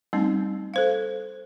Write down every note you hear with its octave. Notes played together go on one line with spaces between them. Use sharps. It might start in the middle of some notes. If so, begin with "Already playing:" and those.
G3 A3 C4 C#4 D#4
A4 C5 F5